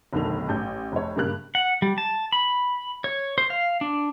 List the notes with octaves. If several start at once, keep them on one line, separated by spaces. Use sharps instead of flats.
F1 B1 D3 D#3 F7
A1 G6
F1 C#5
G2 C#3 A#3 G4 F#6
F#5
G3
A5
B5
C#5
C5
F5
D4